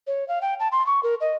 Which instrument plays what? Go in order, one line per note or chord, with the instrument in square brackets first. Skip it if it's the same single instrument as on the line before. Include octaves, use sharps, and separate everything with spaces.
[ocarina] C#5
F5
G5
A5
C6
C#6
A#4
D#5